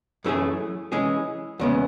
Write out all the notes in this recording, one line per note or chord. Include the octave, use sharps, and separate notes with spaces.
F#2 E3 A3 C#4 G#4
E3 G#3 C#4 G#4
E2 C#3 G#3 B3